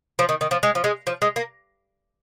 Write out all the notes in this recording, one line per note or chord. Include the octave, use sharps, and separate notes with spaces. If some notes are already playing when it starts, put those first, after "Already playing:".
F3
D#3
D#3
F3
G#3
F3
G#3
F3
G#3
A#3